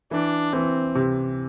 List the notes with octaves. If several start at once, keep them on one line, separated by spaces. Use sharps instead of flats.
E3 D4
E3 C4
C3